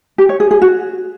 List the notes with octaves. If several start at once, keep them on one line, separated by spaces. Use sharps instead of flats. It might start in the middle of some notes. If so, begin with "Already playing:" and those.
G4
C#5
G#4
G#4
F#4